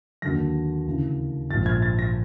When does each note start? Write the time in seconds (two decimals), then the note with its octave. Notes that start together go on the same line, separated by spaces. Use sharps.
0.22 D#2 D3 F#3 A#6
0.86 D2 C#3 E3
1.50 A#1 G#2 F3 A6
1.66 G#6
1.82 A6
1.99 A#6